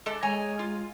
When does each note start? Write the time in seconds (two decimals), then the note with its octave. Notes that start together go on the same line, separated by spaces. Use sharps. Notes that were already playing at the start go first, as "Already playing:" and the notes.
0.06 G#3 A4 D5
0.22 G#3 C#5 G#5 A#5
0.59 F4